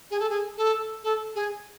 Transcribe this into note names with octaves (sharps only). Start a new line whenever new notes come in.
G#4
A4
G#4
A4
A4
G#4